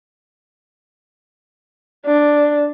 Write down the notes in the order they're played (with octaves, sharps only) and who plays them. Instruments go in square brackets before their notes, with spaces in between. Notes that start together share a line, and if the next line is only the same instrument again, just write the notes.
[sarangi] D4